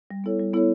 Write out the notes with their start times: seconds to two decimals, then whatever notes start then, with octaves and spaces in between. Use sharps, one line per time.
0.11 G3
0.24 B3 E4 A4 C#5
0.40 G3
0.53 B3 E4 A4 C#5